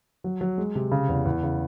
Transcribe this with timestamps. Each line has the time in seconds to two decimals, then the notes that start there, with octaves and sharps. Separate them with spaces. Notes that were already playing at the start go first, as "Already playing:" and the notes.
0.24 F#3
0.41 F#3
0.58 G#3
0.75 C3
0.92 C#3
1.09 E2
1.25 E2
1.43 C#3